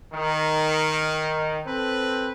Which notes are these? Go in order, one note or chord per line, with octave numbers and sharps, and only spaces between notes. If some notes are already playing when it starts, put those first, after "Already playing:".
D#3
C4 A4 B4